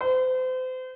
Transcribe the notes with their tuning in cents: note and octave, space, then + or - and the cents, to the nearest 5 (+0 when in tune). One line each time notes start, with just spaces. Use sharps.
C5 -35